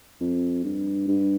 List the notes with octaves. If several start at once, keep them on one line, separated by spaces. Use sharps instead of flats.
F2
G2
G2